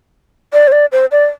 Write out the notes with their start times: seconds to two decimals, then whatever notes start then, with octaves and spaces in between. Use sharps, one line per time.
0.53 D5
0.67 C5
0.72 D5
0.92 C5
1.12 D5